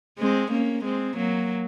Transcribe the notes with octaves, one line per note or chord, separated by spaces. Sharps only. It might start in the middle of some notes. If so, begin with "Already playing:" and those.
G#3 C4
A#3 C#4
G#3 C4
F#3 A#3